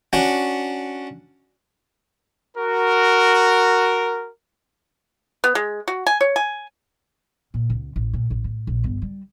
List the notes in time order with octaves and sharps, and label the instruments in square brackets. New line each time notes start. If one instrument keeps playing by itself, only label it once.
[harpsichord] C#4 D4 F#4
[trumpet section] F#4 A#4
[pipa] B3
G#3
F#4
G#5
C#5
G#5
[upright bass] A#2
C#2
A1
A#2
A1
A2
A#1
G1
G3